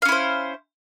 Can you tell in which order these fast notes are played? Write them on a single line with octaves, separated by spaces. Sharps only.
F5 C#4 E4 C5